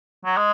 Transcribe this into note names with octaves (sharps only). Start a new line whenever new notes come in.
F#3
G#3